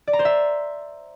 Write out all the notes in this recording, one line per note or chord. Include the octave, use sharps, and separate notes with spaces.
D5
A#5
C5
E5